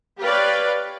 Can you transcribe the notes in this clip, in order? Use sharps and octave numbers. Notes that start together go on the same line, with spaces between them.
G4 B4 C#5 D5 F5 G5